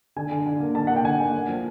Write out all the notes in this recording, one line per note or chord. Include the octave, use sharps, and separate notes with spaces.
D3 G#5
D3
D3
A#3
D3 A5
A#3 F#5
G5
D3 G#5
A#3
A#3
F3